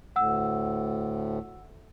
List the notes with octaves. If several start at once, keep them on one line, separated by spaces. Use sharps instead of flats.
D2 A2 F#5 E6